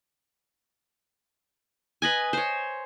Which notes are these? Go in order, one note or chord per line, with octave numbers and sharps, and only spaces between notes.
B4 D#5 G#5
C5 C#5